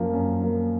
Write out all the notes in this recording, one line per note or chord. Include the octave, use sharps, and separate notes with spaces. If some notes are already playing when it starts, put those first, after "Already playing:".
Already playing: F#2 F3 A#3
F#2
F3 A#3